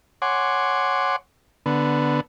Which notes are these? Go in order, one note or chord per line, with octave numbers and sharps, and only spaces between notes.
C#5 F#5 G#5 C6 D6
D3 B3